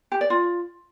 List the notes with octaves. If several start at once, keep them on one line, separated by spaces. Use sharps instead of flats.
G4
D5
F4